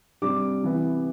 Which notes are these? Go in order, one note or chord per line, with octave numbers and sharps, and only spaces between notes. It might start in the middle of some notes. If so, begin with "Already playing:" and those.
C3 G3 D4 D6
C3 E3 B3